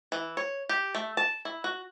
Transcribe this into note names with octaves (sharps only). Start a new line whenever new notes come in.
E3
C#5
G4
A3
A5
E4
F#4